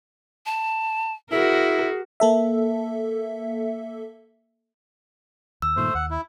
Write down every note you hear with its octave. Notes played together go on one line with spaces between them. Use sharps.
A5
E4 F#4 G#4 A#4
A#3 A4 E5
D#2 E6
G2 A#2 D#3 A3 C5
D#2 F#5
E4